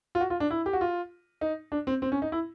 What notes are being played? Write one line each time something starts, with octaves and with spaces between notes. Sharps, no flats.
F4
F#4
F4
D4
E4
G4
F#4
F4
D#4
D4
C4
C4
C#4
D#4
E4